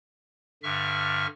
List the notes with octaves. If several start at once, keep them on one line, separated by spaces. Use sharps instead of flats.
G2 D3 E5 C#6 F6